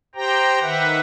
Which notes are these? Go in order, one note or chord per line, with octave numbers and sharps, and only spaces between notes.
G4 C5 G5 A#5
D#3 B4 E5 F#5